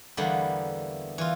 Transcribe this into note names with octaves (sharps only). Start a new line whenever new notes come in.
E2 D3 G3 A#3 B3
E3 F4